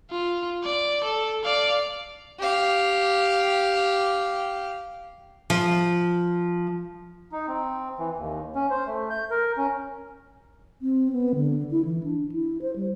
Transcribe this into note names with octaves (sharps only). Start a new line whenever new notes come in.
F4
D5
A4
D5 F5
G4 F5
F3
D#4
C4
E3
D#2
C#4
C5
A3
G6
A#4
C#4
C4
B3
D3
E4
E3
D4
E4
C5
G3